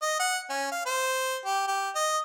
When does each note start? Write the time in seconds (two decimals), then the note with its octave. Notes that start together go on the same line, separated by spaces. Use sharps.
0.02 D#5
0.20 F#5
0.50 C#4
0.72 F5
0.85 C5
1.45 G4
1.68 G4
1.95 D#5